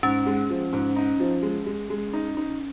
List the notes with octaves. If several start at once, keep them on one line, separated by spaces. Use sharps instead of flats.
G#2 C#4
G#3
F3
G#2
D#4
F3
G#3
G#3
G#3
D#4
D#4